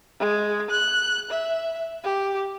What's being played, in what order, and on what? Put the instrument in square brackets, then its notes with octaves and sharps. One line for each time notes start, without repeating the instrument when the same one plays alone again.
[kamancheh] G#3
F#6
E5
G4